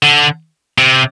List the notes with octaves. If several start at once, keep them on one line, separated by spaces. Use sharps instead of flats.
D3
C3